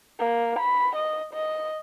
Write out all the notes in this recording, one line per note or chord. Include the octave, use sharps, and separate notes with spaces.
A#3
B5
D#5
D#5